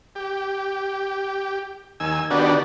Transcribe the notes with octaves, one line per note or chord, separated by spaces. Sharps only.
G4
D#2 G#5 E6
D3 D#3 B3 D4 F#4 G4